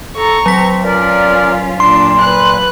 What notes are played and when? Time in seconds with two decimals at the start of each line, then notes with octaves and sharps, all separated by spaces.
0.16 A4 A#5 C#6
0.46 F#3 C4 B6
0.84 C#4 F4 A#4 D5
1.80 A#2 D4 C6
2.21 B4 F#6